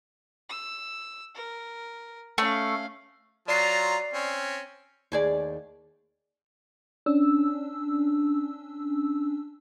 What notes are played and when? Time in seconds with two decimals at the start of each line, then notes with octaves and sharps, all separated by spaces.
0.50 E6
1.35 A#4
2.38 A3 C#4 F5
3.48 F#3 F4 D5 A#5 C7
4.14 C4 C#4
5.12 D#2 G#4 D5
7.06 C#4 D4 E6